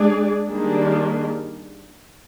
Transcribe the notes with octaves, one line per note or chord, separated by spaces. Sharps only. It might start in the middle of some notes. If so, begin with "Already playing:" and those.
Already playing: G#3 D4 G#4 D5
D#3 G3 A#3 D4 G#4